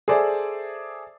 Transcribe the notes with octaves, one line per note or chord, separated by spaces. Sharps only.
G#4 A4 C5 D5 E5